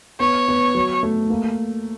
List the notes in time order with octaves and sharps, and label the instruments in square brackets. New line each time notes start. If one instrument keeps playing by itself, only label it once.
[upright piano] B3 [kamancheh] C#5
[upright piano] B3
F#3
A3
A#3